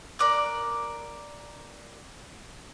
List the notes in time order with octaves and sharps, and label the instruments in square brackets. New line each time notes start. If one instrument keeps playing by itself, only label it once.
[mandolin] A#4 D5 F#6